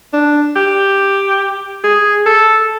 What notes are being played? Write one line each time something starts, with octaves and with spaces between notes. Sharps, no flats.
D4
G4
G#4
A4